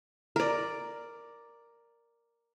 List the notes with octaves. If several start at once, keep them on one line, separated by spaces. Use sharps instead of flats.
A#4 D5